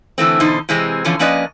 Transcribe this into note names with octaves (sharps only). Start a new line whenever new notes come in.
D3 E3 A3 C4
E2 B2 D3 D#4 C5
C3 E3 G#3 C4
B2 D3 E3 F3 C#4
F3 A#3 C#4 B4 D5 D#5